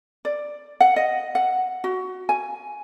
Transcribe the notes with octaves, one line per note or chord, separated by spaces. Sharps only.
D5
F#5
D#5
F#5
F#4
G#5